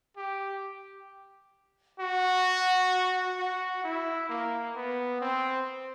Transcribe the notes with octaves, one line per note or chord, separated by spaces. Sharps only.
G4
F#4
F#4
E4
A#3
B3
C4